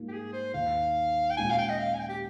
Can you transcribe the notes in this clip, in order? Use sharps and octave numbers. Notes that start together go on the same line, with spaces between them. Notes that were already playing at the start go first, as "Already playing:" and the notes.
Already playing: G#2 G3 A#3 F4
G4
G#4
C5
D#2 D#3 A#3 F5
G5
A#2 G#3 C#4 F4 G#5
F5
G5
D#5
F5
G#5
G5
G4